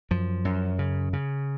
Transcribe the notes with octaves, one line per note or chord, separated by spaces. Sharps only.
F#2 F3
F#2
C#3
C#3